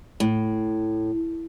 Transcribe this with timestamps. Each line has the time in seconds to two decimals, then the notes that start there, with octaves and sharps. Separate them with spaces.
0.20 A2